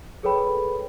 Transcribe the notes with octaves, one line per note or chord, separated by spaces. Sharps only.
G#4 A4 B4 C#5 G5 B5